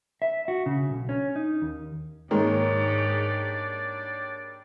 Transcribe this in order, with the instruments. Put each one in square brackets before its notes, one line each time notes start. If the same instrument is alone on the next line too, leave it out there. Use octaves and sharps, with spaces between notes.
[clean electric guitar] E5
F#4
C#3
B1
C#4
D#4
D#2
[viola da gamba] G#2 [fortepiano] D#3 G#3 A#3 [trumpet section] G3 D4 D5 [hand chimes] C#5